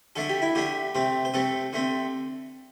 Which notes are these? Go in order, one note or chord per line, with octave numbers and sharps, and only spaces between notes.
D3 A3 D4 A4
G4
E4
D3 A3 D4 G4
C3 A3 C4
C5
C3 A3 C4 A4
D3 A3 C4